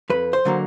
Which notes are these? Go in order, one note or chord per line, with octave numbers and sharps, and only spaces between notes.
F2 B4
C5
D3 F#3 A#3